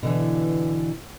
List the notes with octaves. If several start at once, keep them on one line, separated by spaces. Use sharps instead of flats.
B2 D3 E3